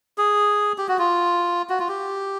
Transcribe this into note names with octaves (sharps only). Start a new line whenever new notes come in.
G#4
G4
F#4
F4
F#4
F4
G4